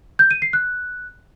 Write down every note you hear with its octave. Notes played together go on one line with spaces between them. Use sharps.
G6
D#7
C7
F#6